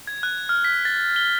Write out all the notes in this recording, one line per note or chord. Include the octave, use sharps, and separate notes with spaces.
G#6
F#6
F6
B6
A6
G7